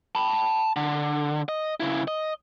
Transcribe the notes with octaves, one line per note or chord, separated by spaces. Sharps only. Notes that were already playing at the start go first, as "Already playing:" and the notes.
A5 B5
D3
D#5
C#3 E4
D#5